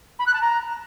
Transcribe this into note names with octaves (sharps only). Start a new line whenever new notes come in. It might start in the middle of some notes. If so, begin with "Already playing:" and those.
B5
F#6
A5
A#5